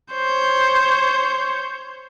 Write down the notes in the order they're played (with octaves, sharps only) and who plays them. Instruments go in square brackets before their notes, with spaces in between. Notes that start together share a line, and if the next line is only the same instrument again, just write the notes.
[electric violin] C5 C#5